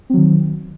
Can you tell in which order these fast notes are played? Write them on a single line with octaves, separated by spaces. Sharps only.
C4 F#3 D#3